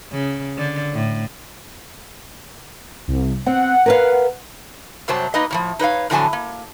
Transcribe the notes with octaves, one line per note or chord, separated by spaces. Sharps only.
C#3
D3
A2
C2
C4 F#5
A#4 B4 F5
F#2 C3 F#3 G3 C5 A5
A#3 D#4 B4 D#5
A2 D#3 F3
D#4 B4 C#5 F5
A2 D3 F3 F#3 G#5 A5
A#3